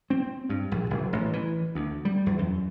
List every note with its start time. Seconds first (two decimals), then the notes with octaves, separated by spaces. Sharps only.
0.10 C4
0.49 G2
0.72 A#1
0.90 F#1
1.13 A1
1.33 E3
1.75 D2
2.05 G3
2.26 E2
2.39 F#2